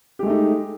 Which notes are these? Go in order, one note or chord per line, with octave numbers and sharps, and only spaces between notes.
G#3 A3 D#4 G4